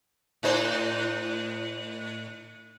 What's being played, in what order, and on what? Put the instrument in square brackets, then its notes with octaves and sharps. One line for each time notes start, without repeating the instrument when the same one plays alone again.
[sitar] A2 D#4 C5